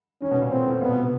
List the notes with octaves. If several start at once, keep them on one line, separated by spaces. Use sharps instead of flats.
D#3 C#4
B2
A#2
A2 C4
A2
A#2 B3
B2
C3